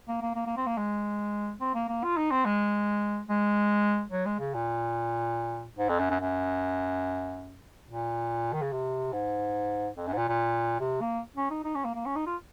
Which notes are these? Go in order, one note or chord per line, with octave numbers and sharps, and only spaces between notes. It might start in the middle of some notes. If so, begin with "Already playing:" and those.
A#3
A#3
A#3
A#3
C4
A#3
G#3
C4
A#3
A#3
F4
D#4
C4
G#3
G#3
F#3
G#3
C#3
A#2
G#2
F2
F#2
F#2
F#2
A#2
D#3
C#3
C3
G#2
F2
F#2
G#2
A#2
A#2
C3
A#3
C#4
D#4
D#4
C#4
A#3
A#3
C#4
D#4
F4